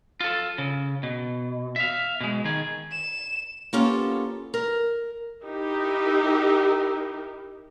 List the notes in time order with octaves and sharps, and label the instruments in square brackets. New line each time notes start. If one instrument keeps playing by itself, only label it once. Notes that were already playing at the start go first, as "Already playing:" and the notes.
[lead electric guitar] F4 A4
C#3
B2
E5 F5
B2 G#3
D#3 G#4
[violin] E7
[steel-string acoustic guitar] A#3 B3 C#4 F4 G4 A4
A#4
[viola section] D#4 E4 G4 A#4